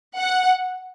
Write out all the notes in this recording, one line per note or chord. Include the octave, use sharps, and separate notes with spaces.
F#5